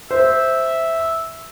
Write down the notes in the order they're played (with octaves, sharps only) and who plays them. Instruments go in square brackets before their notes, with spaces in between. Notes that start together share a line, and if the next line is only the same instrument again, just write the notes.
[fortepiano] C5 [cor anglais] E5